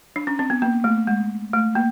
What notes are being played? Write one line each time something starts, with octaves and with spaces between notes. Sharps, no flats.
D4
C#4
C4
B3
A#3
A3
G#3
A3
A#3